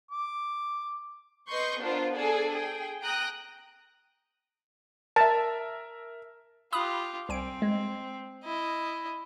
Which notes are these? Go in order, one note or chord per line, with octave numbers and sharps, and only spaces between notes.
D6
B4 D#5 C6 C#6 G6
B3 D4 F4 A#4 C5
D4 G#4 A4 D5
G#4 G5
G5 A#5 D#6 F#6 A#6
A#4 E5 A5
F4 G4 B5 D#6 F#6
C2 C4 G#5 D7
G#3
E4 D#5